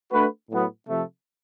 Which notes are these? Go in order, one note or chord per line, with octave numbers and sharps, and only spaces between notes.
A3 D4 F#4 B4
A2 F#3 B3
C3 F3 A3